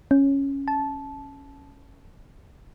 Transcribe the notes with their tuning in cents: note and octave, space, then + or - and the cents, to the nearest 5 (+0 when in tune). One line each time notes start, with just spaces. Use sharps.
C#4 -5
A5 -15